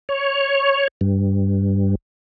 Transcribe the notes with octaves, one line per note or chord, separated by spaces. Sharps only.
C#5
G2